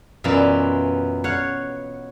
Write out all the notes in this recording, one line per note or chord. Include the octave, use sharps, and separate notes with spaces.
F#2 B2 E3 F4 D5
C#5 F5 F#5